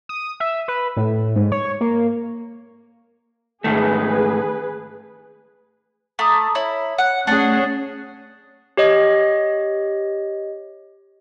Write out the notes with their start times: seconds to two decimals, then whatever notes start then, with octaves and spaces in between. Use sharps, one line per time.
0.09 D#6
0.40 E5
0.68 B4
0.97 A2
1.36 G#2
1.52 C#5
1.81 A#3
3.64 G#2 D#3 A3 G#4 B4
6.19 A3 A#5 D6 D#6
6.55 E4 C#5
6.98 F#5
7.27 A3 C#4 D4 G#4 F#5
8.77 G4 C#5 D#5